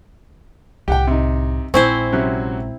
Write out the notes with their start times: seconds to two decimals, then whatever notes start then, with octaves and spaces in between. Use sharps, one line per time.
0.88 C2 A2 G4 F#5 G5
1.07 C3 D#4
1.74 A#1 G#3 C4 E4 C5 G#5 C#6
2.12 C3 F#3 C#4